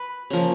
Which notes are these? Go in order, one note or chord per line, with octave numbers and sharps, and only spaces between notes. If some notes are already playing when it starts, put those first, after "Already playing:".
Already playing: B4
C#3 F3 A#3